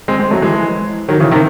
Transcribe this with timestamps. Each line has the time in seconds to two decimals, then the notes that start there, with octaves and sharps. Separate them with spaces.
0.08 G#3 C4
0.19 G#3 C4
0.31 F#3 A3
0.42 E3 G#3
1.09 D#3 F#3
1.20 C#3 E3
1.31 C3 D#3